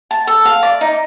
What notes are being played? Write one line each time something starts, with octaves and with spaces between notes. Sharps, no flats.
A5
A4
F5
D5
D#4